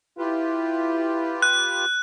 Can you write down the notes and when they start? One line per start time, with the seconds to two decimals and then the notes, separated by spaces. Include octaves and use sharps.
0.18 E4 F4 G4 B4
1.42 F#6